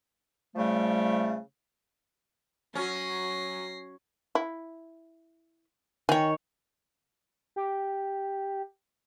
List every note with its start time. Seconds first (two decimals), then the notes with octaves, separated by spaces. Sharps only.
0.55 C#3 F3 G3 A3
2.75 F#3 C#4 A#6 C7
4.35 E4
6.09 D#3 C#5 G5 G#5
7.56 G4